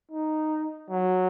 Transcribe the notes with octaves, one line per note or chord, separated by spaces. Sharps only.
D#4
F#3